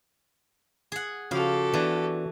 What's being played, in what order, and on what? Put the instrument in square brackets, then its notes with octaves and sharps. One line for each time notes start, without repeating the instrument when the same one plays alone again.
[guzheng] G#4 F#5
[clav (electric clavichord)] C#3 F3 C5 [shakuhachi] F#4 [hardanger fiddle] G4 A4 [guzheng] F5
[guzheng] E3 [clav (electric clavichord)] B3 D4